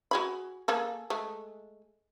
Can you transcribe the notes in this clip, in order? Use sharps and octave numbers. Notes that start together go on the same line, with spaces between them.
F#4 G#4 B5
A#3 G#4 A4
G#3 A3